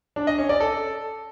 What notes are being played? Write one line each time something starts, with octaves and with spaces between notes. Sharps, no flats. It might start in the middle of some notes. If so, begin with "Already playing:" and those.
D4
D#5
C#4
D5
A4